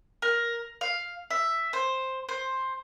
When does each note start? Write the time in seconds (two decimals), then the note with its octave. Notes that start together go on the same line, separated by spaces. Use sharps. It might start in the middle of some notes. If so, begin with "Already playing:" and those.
0.22 A#4
0.81 F5
1.30 E5
1.73 C5
2.29 C5